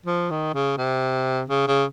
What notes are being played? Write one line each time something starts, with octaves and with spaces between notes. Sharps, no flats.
F3
D#3
C#3
C3
C#3
C#3